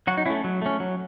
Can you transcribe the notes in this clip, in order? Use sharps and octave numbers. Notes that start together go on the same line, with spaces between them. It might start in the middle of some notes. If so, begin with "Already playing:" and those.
F#3 F#4
D#4
A3 C#4 E4
F#3
A3 C#4
F#3